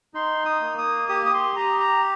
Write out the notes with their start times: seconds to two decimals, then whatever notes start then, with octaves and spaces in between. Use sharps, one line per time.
0.14 D#4 C6
0.45 D#6
0.61 A#3
0.78 D#6
1.09 G4 D#6
1.26 D#6
1.33 C6
1.56 G4 A#5
1.80 A#5